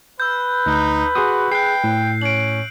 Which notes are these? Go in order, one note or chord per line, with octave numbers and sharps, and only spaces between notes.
B4 E6 G6
D2 D#4
F#4 G#4 C6 D#6
G#4 G5 F#6 C7
A2
C#4 D7 F#7